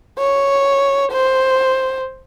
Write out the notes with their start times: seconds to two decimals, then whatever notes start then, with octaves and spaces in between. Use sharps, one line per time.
0.19 C#5
1.12 C5